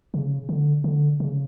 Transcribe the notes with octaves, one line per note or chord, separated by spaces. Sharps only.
C#3
D3
D3
C#3